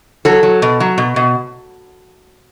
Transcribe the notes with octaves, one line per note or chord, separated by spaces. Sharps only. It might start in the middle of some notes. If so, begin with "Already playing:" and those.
F#3 A4
F#3
B2
F#3
B2
B2